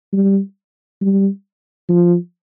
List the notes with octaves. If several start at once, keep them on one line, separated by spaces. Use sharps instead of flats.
G3
G3
F3